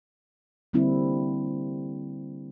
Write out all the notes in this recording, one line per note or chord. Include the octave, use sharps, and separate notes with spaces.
D3 G3 A#3 C4 E4